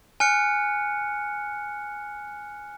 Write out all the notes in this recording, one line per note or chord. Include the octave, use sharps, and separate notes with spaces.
G#5 F6 F#6 C#7